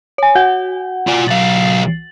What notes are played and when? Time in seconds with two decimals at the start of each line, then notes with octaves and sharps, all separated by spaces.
0.18 C#5 G#5
0.35 F#4 F#5
1.08 F4 D5
1.28 B1 F5 A6 F#7